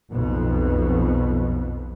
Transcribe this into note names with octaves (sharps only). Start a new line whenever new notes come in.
B1 F2 B2